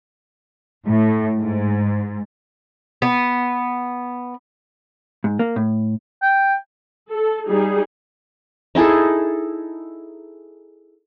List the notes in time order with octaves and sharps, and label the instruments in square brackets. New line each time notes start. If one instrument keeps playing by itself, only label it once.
[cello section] A2
G#2
[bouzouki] B3
[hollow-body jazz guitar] G#2
A#3
A2
[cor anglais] G5
[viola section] A4
G3 D#4 G#4
[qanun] D#4 E4 G#4 A4